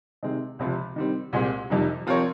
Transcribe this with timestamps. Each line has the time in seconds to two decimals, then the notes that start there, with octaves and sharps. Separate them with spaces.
0.23 C3 D#3 G#3 C4
0.59 C#2 C3 F3
0.96 D#3 G3 C4
1.33 C2 A#2 G#3 C4
1.70 F2 C3 D#3 G3
2.07 F3 C4 F4 A#4 C#5